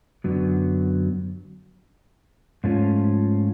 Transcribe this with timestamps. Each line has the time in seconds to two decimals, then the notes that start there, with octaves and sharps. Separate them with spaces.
0.24 F#2 D3 F#3 B3
2.64 G#2 F3 A3 C#4 F4